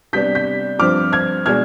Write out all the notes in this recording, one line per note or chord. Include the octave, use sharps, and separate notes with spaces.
C3 G3 B3 D4 G6 B6
G6 B6
G2 F3 C4 D6 F6
F6 G#6
B2 G#3 D4 F6 G#6